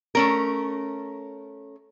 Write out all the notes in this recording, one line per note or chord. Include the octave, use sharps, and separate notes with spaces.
A3 C#4 A#4